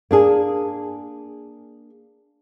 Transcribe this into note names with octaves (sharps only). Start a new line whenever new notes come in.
A#3 D4 G#4